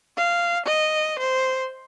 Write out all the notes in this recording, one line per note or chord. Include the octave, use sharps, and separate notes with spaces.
F5
D#5
C5